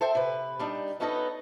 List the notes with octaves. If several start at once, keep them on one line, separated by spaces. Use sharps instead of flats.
A4 C5 E5 G5
C3 B4
G3 D4 D#4
B3 C#4 D#4 A4 B4 D#5